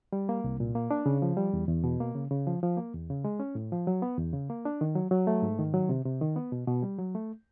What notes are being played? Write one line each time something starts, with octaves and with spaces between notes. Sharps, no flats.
G3
A#3
C2
A#2
A#3
D4
C#3
F3
G3
E2
E2
B2
A#3
C#3
C#3
F3
F3
A#3
E2
C#3
G#3
C#4
A2
F3
F#3
B3
E2
C#3
A#3
D4
D#3
F#3
F#3
A3
G#2
D#3
F#3
C3
C3
D#3
B3
B2
B2
G3
F#3
A3